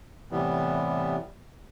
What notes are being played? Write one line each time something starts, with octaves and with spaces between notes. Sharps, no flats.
A2 C3 E3 G3 B3